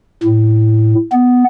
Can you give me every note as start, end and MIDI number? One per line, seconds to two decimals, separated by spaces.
0.23 0.94 45
1.13 1.44 59